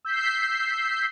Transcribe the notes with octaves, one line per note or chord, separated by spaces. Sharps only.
E6 G6 B6 C7